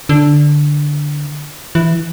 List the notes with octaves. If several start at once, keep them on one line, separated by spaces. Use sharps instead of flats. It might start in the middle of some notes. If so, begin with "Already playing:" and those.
D3
E3